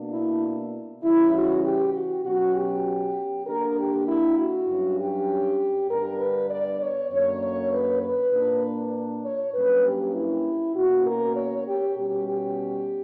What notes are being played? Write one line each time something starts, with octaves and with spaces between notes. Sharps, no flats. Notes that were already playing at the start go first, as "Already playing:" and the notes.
Already playing: B2 A#3 D4
E4
C#3 E3 G3 C#4 E4
F#4
G4
F#4
B2 F#3 C#4 F#4
G4
D3 A#3 D4 A#4
G4
E4
F#4
G2 F#3 C#4
G4
G2 D3 G3 B3 D4 A#4
B4
D5
C#5
F#2 D3 A#3 C#5
C#5
B4
B4
A#2 A#3 D4
C#5
G2 F#3 A#3 C#4 B4
G4
E4
B2 A#3 C#4 F#4
A#4
C#5
G4
B2 G3 C#4 G4
G4